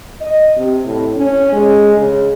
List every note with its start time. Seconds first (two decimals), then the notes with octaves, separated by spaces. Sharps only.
0.21 D#5
0.57 C3
0.85 A2
1.17 C#4
1.53 G#3
1.97 C#3